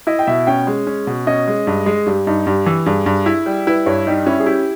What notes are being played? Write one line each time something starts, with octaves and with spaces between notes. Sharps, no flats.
E4 D#5
G5
B2 E5
C#4 G5
G#3
C#4
B2
C#4 D#5
G#3
G2
G#3
G2 G4
G2 D#4
G2 G4
E3
G2 G#4
G2
E4
G3
E4 B4
G2 C#5
G3 D#4
C#4 E4
G#4
E4 G4